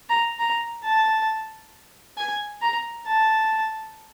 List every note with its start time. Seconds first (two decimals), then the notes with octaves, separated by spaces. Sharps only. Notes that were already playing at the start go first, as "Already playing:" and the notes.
0.09 A#5
0.39 A#5
0.84 A5
2.17 G#5
2.62 A#5
3.07 A5